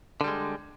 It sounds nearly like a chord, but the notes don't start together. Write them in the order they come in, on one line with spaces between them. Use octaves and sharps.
D3 G3 G#3